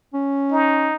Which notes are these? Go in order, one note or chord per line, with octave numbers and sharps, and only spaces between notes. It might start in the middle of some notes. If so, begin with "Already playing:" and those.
C#4
D#4